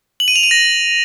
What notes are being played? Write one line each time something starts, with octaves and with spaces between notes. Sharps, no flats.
F#7
D#7
F7
D#7
A#6